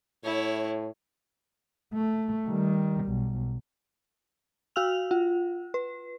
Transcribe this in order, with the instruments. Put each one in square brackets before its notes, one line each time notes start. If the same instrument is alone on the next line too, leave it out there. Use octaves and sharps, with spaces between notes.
[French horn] A2 [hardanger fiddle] E4 C#5
[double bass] A3
D#3 G3
B1
[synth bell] F#4 F5 E6 F6 F7
F4
B4